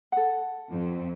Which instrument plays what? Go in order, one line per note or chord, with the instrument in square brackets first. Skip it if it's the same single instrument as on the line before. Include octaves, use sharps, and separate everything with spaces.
[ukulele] A4 F#5
[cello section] F2